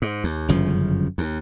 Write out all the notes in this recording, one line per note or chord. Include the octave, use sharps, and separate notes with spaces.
G#2
D#2
G1 F#2 C#3 F3
D#2